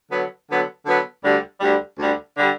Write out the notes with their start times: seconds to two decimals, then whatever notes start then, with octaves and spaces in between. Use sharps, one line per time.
0.11 D3 F#3 B3
0.48 D3 F#3 B3
0.85 D3 F#3 B3
1.23 D2 D3 G3
1.61 D2 D3 G3
1.98 D2 D3 G3
2.38 D3 G3